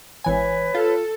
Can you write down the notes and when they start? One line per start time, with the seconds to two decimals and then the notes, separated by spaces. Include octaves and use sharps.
0.24 G#1 E3 B4 C#5 G#5
0.75 F4 A4